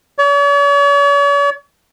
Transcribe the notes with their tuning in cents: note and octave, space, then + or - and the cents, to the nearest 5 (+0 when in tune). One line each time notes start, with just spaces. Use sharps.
C#5 +45